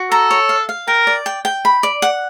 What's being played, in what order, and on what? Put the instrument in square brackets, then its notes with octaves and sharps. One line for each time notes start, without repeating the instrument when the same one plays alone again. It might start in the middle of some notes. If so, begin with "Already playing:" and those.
Already playing: [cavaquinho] F#4
[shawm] A4 [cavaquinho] A#5
[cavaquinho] C#5
F5
F5
[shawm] A#4 [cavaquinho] G5
[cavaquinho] D5
G5
G5
B5
D5
F#5